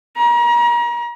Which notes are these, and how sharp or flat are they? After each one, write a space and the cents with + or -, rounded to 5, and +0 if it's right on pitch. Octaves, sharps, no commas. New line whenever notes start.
A#5 +35